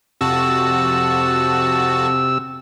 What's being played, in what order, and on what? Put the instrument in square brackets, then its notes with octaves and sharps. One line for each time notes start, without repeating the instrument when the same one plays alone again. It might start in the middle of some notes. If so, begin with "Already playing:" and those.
[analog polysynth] F2 F#4 A5 [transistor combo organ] C3 E6